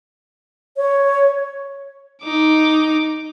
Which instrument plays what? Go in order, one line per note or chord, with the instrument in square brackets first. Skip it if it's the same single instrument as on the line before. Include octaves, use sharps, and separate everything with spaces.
[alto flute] C#5
[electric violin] D#4 D6